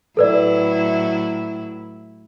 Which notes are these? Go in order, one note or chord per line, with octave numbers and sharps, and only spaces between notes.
A2 F#3 E4 A4 B4 D5